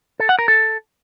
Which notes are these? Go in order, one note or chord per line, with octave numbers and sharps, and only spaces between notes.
A4
F#5
A#4
A4